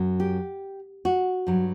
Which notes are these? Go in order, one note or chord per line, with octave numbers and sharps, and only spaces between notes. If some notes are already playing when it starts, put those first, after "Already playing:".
Already playing: F#2 F#3
G4
F#4
G2 F#3